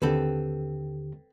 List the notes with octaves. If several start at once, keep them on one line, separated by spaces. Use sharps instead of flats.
D#2 D3 C4 G4 A4 B4